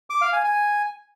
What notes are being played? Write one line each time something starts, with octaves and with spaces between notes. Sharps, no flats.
D6
F5
G#5
G#5